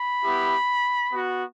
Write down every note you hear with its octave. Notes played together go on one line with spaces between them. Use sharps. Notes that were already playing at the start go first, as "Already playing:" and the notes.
Already playing: B5
B3 E4 G4
B3 F#4